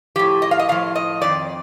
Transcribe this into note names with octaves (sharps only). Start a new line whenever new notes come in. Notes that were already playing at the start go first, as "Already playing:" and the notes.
A2 F3 G4
D#5
F5
D#5
A2 F3 F5
D#5
F2 D#3 D5